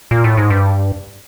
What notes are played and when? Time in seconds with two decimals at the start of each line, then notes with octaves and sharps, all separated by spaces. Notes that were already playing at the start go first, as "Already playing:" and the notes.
0.11 A#2
0.24 A2
0.37 G#2
0.50 G2